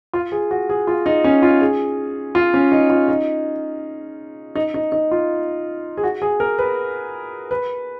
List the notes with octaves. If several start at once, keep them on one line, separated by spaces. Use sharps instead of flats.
F4
G#4
F#4
G#4
F4
D#4
C#4
F4
G#4
F4
C#4
D#4
F4
D#4
D#4
D#4
D#4
F4
G#4
F#4
G#4
A#4
B4
B4